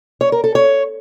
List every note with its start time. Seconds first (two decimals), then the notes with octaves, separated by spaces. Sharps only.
0.21 C#5
0.32 A#4
0.44 A4
0.55 C#5